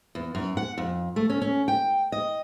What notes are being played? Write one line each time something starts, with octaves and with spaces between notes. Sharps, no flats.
E2
F#2
F#5
F2
A3
C#4
C#4
G5
D#5